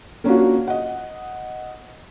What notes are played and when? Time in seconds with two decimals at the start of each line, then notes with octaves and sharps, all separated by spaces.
0.24 A#3 C#4 D4 F4 F#4
0.68 D#5 F#5